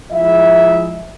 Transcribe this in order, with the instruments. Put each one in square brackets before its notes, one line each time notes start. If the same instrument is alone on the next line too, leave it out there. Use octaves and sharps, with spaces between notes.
[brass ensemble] F3 G#3 D#4 E4 G#4 E5